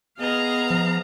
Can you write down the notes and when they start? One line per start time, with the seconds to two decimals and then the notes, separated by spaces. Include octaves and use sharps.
0.19 B3 G#4 D#5 F5 A#5
0.70 F3